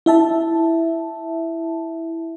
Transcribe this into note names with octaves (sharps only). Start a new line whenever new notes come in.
E4 E5 A5